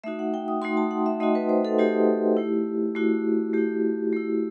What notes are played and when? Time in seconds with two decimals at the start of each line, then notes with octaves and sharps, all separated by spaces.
0.04 A3 D#4 F#4 E5
0.19 F#5
0.34 G5
0.48 D#6
0.62 A3 D#4 F#4 C6
0.77 A5
0.91 F#5
1.06 E5
1.20 A3 D#4 F#4 D#5
1.35 B4
1.49 C5
1.65 A4
1.79 A3 D#4 F#4 G4
2.37 A3 E4
2.95 A3 E4 F#4
3.53 A3 E4 G4
4.13 A3 E4